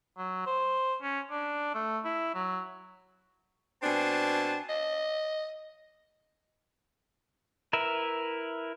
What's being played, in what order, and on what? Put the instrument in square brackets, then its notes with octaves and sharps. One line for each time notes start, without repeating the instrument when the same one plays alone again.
[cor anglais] F#3
C5
C#4
D4
A3
E4
F#3
[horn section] B2 C4 D4 G#5 A5
[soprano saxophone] D#5
[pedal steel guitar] E4 A#4 B4 E5